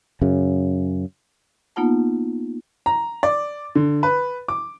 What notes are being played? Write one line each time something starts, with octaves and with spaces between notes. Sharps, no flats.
F#2 C#3
A#3 B3 D#4 F4 F#5 A5
A#5
D5
D3
B4
D6